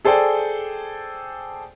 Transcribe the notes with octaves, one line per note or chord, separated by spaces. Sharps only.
G#4 A4 C5 D5 G5 G#5